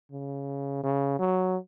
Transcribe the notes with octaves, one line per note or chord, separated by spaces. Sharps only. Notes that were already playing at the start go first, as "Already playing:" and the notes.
C#3
C#3
F#3